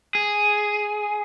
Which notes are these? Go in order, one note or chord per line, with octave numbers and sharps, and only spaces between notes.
G#4